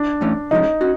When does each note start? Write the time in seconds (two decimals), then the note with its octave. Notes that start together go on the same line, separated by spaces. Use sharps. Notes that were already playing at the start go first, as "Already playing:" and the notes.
Already playing: D4
0.21 A2 E3 A3 C#4
0.51 C3 F3 G#3 C#4 D#4
0.81 C#4 F#4